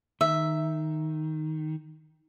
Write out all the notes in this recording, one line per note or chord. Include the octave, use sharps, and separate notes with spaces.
D#3 E5